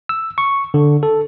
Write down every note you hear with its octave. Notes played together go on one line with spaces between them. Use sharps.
E6
C#6
D3
A4